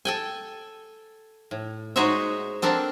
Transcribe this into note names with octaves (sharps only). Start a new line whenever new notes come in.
A4 G5 G#5
A2
G#3 D#4 F#4 C5 C#5 E5
C4 D4 A4 A#4 F#5